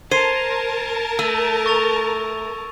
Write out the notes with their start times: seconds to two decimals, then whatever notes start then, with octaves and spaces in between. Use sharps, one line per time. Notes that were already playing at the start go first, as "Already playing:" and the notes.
0.11 A#4 C5 A5 G#6 C7 D#7
1.19 A3 E6 D#7
1.66 C#6 A6 F7